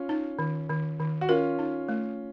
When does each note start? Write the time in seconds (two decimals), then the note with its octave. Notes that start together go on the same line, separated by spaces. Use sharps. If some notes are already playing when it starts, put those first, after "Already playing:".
Already playing: C#4 F4
0.09 D#4
0.39 D#3
0.69 D#3
0.99 D#3
1.21 F#4
1.29 C#4 F4 A#4
1.59 D#4
1.89 A3